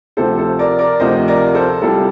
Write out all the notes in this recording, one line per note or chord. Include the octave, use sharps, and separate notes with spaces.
D2 C3 F3 A4 C5
A4 C5
A#4 D5
A#4 D5
D2 C3 F3 C5 D#5
A#4 D5
A4 C5
C2 C3 G3 F4 A4